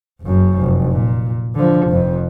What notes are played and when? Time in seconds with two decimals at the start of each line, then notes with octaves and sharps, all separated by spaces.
0.22 F#1 F#2
0.58 F1
0.92 A#2
1.55 D3 F3
1.87 F1 F2